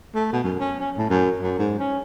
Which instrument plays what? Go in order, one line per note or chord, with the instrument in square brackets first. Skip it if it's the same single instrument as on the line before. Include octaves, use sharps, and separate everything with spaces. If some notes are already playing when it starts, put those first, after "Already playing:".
[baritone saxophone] A3
B2
F#2
C#4
C#4
A2
F#2
F#2
G#2
C#4